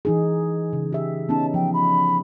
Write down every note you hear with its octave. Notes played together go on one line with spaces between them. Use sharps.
E3 D#4 G#4
C#3
G4 E5
B3 C#4 D#4 A5
F3 G5
B5